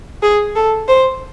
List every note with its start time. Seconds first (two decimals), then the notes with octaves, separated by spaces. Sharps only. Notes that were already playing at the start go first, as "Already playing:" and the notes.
0.23 G#4
0.56 A4
0.89 C5